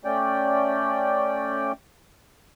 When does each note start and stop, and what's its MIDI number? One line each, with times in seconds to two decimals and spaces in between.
0.05 1.72 57
0.05 1.72 61
0.05 1.72 74
0.05 1.72 79